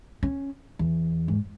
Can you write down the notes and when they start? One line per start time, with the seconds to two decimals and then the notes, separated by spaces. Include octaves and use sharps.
0.23 C#4
0.79 E2
1.28 G#2